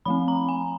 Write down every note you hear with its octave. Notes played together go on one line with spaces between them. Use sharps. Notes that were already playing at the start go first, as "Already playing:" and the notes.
F3 A3 C4 B5
A#5
G#5